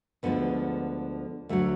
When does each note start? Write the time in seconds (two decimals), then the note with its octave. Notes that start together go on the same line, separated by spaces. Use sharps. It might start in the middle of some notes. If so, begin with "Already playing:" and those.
0.23 D2 D3 F3 G#3 B3
1.49 D2 D3 F#3 A3